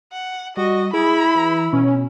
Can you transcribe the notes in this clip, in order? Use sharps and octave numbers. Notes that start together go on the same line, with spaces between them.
F#5
G3 F#4 D#5
E4 G#4 B5
E3
B2 C#4